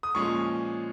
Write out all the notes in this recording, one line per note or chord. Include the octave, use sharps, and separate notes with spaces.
D#6
A#2 F3 G#3 C#4 C#6